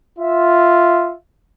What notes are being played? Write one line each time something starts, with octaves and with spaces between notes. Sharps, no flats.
F4 E5